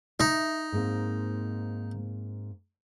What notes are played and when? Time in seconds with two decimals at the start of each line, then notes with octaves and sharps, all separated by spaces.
0.20 D#4 E5
0.72 G#2 A#3 C4